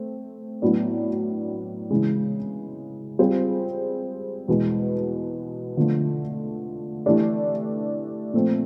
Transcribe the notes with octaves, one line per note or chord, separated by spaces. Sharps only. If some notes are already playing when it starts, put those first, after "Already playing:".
Already playing: A3 C4
A2 F#3 B3 D4
C#3 E3 G#3
G3 C4 F4 G#4 C5
E2 B2 G#3
D3 F3 A3
E3 A3 D4 G4
A#2 F3 A3 C4